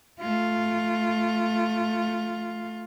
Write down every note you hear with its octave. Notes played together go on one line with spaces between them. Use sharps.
A3 F4